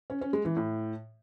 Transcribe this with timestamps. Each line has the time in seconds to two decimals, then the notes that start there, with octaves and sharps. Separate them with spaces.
0.10 C#4
0.21 C#4
0.33 G#3
0.45 E3
0.56 A2